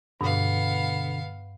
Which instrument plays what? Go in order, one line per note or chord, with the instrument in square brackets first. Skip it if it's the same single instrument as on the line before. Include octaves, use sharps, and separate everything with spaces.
[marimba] G2 D#6 [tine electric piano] B2 D3 [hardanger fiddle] B3 F5